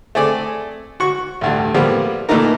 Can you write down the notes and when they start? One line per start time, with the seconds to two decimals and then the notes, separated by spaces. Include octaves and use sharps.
0.15 A3 C4 G#4 D5
1.00 F#4 C#6
1.41 A1 D2 G2
1.75 A2 F3 G3 A#3 B3
2.29 A#2 E3 A3 D4 D#4 A#4